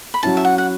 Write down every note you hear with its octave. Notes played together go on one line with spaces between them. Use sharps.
B5
F#3 C#4 E4 A5
E5
F#5
F#5